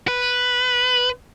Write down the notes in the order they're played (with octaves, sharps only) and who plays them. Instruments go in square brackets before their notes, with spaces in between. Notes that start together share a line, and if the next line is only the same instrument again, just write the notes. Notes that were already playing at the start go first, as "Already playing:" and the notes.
[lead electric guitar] B4